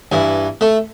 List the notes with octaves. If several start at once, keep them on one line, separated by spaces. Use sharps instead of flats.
G2 E3
A3